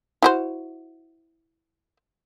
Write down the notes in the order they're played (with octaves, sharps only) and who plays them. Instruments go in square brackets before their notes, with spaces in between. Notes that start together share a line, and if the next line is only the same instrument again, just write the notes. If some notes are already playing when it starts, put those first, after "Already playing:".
[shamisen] E4 F#4 C5